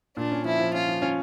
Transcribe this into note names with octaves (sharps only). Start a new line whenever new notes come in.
A#2 D4
C#4
F3 E4
F3
C#4 F4
F3
C#4